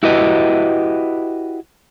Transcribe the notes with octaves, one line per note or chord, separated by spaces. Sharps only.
E4 F#4 G4 B4 D#5